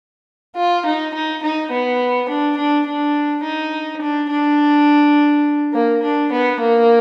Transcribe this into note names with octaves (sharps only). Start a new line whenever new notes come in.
F4
D#4
D#4
D#4
B3
D4
D4
D4
D#4
D4
D4
A#3
D4
B3
A#3